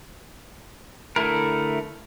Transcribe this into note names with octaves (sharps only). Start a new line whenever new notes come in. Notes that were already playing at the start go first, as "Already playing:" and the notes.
D3 A3 E4 A#4